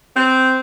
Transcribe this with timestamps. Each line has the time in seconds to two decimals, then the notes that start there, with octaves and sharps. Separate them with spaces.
0.15 C4